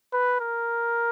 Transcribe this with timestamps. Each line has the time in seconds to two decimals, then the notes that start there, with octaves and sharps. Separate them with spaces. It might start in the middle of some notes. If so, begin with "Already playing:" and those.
0.13 B4
0.40 A#4